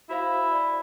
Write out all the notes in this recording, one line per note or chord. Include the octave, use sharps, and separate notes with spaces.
E4 F#4 C5 F5
D5 B5